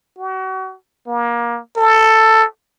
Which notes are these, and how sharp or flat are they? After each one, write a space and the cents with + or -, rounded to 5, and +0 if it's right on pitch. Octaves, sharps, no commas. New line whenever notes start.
F#4 +35
A#3 +25
A4 +10